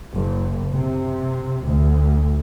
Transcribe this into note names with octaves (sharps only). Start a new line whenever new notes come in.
F#1
C3
D2